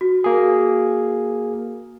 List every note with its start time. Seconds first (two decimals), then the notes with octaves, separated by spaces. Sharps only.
0.01 F#4
0.24 A#3 G#4